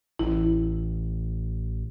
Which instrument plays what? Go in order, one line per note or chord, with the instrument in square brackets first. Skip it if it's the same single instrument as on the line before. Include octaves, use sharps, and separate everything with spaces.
[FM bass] A1 [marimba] E4